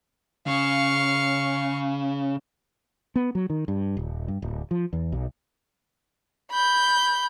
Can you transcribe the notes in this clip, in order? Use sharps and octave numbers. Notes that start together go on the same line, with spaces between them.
C#3 F5 C#6
B3
F#3
D#3
G2
D#1
G2
D1
F3
E2
B1
B5 G6